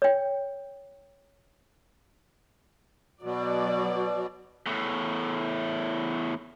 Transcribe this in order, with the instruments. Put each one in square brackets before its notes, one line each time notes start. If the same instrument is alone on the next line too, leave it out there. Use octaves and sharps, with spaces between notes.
[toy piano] C#5 G5
[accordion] B2 [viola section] F#3 D5
[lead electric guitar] E2 A2